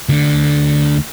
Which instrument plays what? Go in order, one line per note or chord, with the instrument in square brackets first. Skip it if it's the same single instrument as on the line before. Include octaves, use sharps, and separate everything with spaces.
[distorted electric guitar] D2 D3